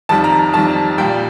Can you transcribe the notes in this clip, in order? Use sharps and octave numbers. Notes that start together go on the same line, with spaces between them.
F2 D#3 G3 A5
A#5
F2 D#3 G3 A5
A#2 G3 G5